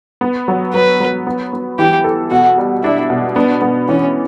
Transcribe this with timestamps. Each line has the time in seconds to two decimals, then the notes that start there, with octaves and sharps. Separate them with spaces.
0.21 B3
0.48 F#3
0.74 F#3 B4
1.00 F#3
1.27 B3
1.53 B3
1.79 E3 G4
2.04 A4
2.31 B2 F#4
2.58 G3
2.83 D4 E4
3.10 B2
3.36 B3 D4
3.62 B3
3.88 E3 C#4